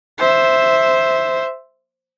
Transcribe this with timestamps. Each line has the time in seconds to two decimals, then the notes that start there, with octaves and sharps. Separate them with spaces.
0.18 C5 E5